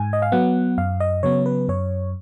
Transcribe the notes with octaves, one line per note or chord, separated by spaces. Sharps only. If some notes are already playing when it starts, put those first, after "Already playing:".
Already playing: G#2 G#5
D#5
F5
F#3 B3 F#5
F#2 F5
D#5
C#3 F#3 B3 C#5
B4
F#2 C#5